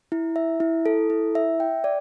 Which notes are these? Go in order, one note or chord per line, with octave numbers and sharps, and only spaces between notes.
E4
E5
E4
A4
E4
E5
G5
D5